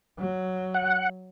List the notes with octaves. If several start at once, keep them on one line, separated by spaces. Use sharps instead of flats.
F#3
F#5